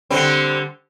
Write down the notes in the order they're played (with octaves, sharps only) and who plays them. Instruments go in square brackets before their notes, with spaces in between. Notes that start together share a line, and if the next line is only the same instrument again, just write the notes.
[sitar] D3 G3 C4